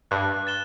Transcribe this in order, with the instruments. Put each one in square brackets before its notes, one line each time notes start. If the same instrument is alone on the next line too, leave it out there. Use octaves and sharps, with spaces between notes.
[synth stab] G2 [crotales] F#6
[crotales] A6 E7 G7